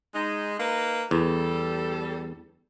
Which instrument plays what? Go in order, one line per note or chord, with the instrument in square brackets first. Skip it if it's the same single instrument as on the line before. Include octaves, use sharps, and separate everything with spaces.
[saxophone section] G#3 D#4
A#3 D#4 B4
[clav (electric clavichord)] E2 [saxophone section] G3 A4